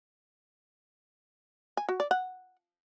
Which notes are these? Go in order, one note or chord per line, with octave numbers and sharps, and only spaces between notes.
G#5
F#4
D5
F#5